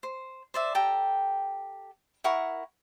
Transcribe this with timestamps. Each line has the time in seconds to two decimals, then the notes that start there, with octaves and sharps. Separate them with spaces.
0.03 C5
0.54 C5 D5 E5
0.75 G4 A4 G5 A#5
2.24 E4 A#4 F#5 C#6